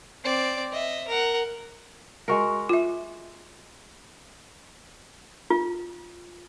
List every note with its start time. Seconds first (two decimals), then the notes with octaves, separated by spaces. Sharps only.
0.24 C4 D5
0.72 D#5 E5
1.08 A#4 F#5
2.28 G#3 F#4 A#4
2.69 F4 E5
5.50 F4